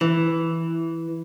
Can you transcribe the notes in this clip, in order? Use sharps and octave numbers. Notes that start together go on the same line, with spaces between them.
E3